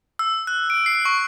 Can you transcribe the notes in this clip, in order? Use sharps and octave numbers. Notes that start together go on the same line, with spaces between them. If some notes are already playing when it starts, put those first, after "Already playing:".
E6
F#6
D7
C7
C#6